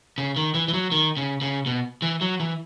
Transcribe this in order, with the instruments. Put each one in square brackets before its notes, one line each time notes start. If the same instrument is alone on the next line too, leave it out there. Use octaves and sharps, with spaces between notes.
[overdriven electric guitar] C#3
D#3
E3
E3
F#3
D#3
C#3
C#3
B2
E3
F#3
E3